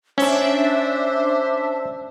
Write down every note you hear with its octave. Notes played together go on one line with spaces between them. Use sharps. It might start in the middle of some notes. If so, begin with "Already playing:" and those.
C#4 D4 C5 E5